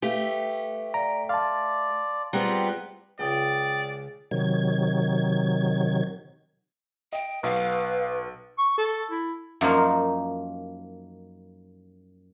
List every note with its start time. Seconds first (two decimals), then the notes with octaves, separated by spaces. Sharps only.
0.02 A3 G4 B4 F5 G5
0.94 D5 A#5
1.29 D5 F5 A5 C6
2.33 G3 B3 C4 F4 G#4 F#5 G5 A#5
3.19 C#2 D5 G5 D#6
4.31 C3 D#3 F#3 G#6
7.13 D#5 G5
7.43 B1 B4 F5
8.58 C#6
8.78 A4
9.11 E4
9.61 F#2 F3 A#3 D#4